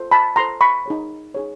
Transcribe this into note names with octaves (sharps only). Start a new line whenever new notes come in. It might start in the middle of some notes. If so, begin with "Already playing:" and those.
Already playing: F4 A4 C5
A5 B5
F4 A4 C5 A#5 C6
B5 C#6
D#4 G#4 C#5
D#4 G#4 C#5